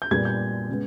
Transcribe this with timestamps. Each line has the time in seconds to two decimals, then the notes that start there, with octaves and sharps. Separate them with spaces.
0.02 G6
0.11 A#2 G3 B3 G#6
0.25 G6
0.69 C#3 G#3 B3